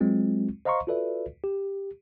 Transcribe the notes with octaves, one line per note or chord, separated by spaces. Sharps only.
F#3 G#3 C4 F4
C5 D#5 F5 A#5 C6 C#6
F4 F#4 A4 B4 D5 E5
G4